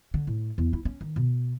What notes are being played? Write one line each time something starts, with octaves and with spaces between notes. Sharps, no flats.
D3
A2
E2
E4
C#4
D#3
B2